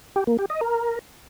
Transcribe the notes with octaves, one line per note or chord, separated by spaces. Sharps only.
G4
A#3
G4
D#5
A#4